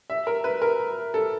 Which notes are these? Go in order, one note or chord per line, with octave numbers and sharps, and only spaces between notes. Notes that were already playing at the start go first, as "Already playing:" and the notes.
E5
A#4
B4
A#4
A4